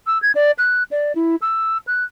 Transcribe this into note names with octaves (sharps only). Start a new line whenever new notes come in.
E6
G#6
D5
F#6
D5
E4
E6
F#6